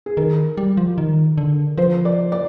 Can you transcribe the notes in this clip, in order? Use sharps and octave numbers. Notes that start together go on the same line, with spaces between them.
G#4
D#3 A#4
G3
F3
D#3
D3
F3 C5
D5
D5